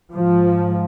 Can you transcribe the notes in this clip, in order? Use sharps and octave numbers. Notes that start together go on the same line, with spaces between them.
G#2 F3